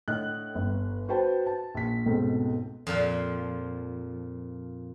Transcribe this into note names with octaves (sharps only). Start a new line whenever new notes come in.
A2 D3 D#5 F#6
G1
F#4 B4 C5 G5 A5
A5
A#1 B6
C#2 G#2 B2 A3 C4
F2 A#2 F3